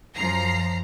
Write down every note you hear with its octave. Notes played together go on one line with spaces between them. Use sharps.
F#2 F3 A#5 C7